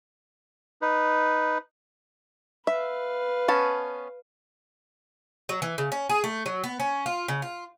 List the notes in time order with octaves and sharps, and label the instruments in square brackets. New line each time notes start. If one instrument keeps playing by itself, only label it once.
[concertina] D#4 B4
[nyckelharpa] B4 F5 [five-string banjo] E5
[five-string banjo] B3 C#4 A5
[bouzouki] F#3
E3
C#3
C#4
G#4
A3
F#3
B3
C#4
F4
C#3
F4